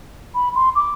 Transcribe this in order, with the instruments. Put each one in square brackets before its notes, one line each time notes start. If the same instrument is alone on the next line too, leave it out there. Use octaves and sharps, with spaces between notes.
[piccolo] B5
C6
D6